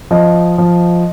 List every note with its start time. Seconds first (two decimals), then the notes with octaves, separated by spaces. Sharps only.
0.11 F3 D#5
0.58 F3